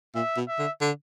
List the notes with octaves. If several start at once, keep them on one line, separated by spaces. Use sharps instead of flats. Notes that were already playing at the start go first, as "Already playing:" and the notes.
A#2 E5
B2
E5
D3
D3